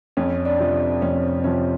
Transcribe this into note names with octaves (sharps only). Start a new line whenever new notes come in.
F2 C#4
D4
C3 F3
F2 C#4
C4
C3 F3 C#4